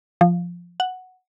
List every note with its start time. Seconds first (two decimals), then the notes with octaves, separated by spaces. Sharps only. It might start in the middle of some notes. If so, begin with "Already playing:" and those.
0.21 F3
0.80 F#5